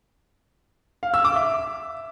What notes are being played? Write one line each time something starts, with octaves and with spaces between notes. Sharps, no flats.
F5
E6
D6
E5